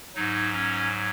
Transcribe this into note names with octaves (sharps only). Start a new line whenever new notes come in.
G#2 F#3 D#4
C#4